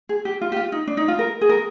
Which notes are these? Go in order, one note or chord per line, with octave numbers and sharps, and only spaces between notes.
G#4
G4
F4
G4
F4
D#4
D4
D#4
F4
A#4
G#4
A#4